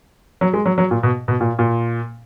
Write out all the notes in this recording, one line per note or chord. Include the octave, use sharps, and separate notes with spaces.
F#3
G#3
F#3
F#3
A#2
B2
B2
A#2
A#2